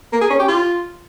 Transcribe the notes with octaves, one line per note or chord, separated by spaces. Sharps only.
A#3
G#4
C#4
G4
F4